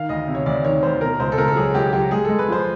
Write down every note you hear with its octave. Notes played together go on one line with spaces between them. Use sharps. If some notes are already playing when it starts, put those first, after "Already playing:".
Already playing: D#3 F5
D2 D#5
C3
C#5
D2 D5
D#3 C#5
D2 C5
B2 A#4
C#2 C5
A4
C#2 A#4
A4
F#3 G#4
C#2 G4
F#3 G4
G#3 G#4
G#3 A4
B4
F3 C5